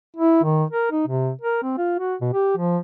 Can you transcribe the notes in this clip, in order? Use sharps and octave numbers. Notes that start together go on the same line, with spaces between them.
E4
D#3
A#4
D#4
C3
A#4
C4
F4
F#4
B2
G4
F3